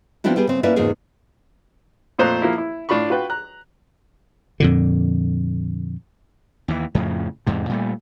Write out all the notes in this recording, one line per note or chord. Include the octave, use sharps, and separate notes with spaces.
F3 B3 C4 D4 E4 F#4
G3 B3 G4 G#4
C#3 C4
A#3 C#4 E4 B4 D5 E5
E2 G#2 C#3 A#3 F4 G#4
F2 A#2 A3 C5 A#5 F#6
F3 A#3 E4
E4
A2 D4 F4 F5 B5 C#6
F4 F#4 B4 G5
A#5 F#6
F2 A#2 D3
D#2 E3
F2 A2 C#3 F3
E2 G#2 C3
A#2 G3 A3